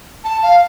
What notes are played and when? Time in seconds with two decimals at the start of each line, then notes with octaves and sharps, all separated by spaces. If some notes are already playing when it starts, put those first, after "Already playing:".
0.24 A5
0.43 F5